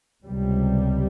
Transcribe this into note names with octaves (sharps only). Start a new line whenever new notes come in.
C#2 C3 G3